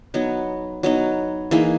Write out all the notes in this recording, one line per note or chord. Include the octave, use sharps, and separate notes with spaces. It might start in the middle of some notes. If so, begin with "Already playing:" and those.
F#3 B3 D#4
F#3 B3 D#4
E3 A#3 D#4 G#4